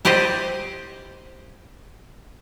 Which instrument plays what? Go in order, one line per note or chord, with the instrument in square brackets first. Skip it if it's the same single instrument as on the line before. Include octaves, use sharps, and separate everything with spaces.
[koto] E4 G4 C5 D5 D#5